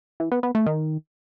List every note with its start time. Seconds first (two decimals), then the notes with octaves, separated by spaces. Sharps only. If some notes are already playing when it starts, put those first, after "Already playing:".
0.20 E3
0.32 B3
0.43 B3
0.55 A3
0.66 D#3